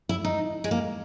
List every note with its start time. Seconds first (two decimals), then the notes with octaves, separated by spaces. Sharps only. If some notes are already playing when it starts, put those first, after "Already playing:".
0.09 E4
0.25 D#4
0.64 G#3
0.71 A#3